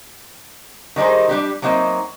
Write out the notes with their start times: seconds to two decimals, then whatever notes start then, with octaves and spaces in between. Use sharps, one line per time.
0.96 D#3 G3 D#4 G#4 C5
1.29 G3 D4 G4
1.62 F#3 A#3 C4 D#4 E5